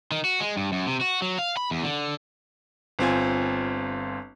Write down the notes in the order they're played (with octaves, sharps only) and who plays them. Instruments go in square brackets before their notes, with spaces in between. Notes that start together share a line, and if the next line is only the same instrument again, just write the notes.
[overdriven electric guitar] D#3
F#4
G#3
G2
F#2
C3
F#4
F#3
F5
B5
E2
D3
[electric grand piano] G1 C4 F4 G#5